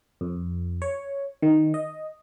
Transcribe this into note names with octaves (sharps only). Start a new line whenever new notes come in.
F2
C#5
D#3
D#5